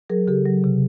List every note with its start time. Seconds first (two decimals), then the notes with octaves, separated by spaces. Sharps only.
0.10 F#3 G#4 A#4
0.27 C#3 G4 A4
0.46 F#3
0.64 C3